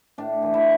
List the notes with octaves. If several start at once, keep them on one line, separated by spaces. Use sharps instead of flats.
A2 D4
E3
E4